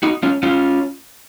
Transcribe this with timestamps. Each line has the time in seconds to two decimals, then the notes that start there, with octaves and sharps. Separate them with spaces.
0.03 D#4 F#4
0.23 C#4 F4
0.43 C#4 F4